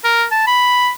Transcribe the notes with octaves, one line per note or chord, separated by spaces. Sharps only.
A#4
A5
B5